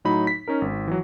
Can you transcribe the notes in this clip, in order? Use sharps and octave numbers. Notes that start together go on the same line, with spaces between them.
A2 F#3 D#4 B5
B6
C#4 D#4 A#4
G#1
E3 F#3